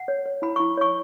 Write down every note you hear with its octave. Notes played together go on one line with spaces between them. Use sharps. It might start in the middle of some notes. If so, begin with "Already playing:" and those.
Already playing: F#5
C#5
C#5
E4 B5
E4 C#6
C#5 C#6